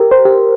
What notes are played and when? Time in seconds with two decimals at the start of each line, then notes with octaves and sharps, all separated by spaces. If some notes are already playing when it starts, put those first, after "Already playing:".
Already playing: G4 A#4
0.11 C5
0.25 G4